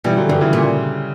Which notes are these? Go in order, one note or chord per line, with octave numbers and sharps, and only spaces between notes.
B2 E3 G3
D3 F#3
G2 D3
C#3 E3
A#2